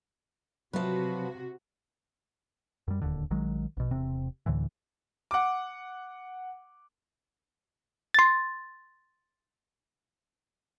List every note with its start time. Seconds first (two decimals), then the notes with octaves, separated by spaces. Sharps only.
0.73 C3 F3 F#3 F#4 B4 E5
2.88 F#2 G3
3.02 D1 D#2 D3
3.31 A#1 D#3 F#3 G#3
3.77 A#1 B2
3.91 E1 C3 C4
4.46 D2 A2 D3 E3
5.31 F#5 D6
8.14 C6 A6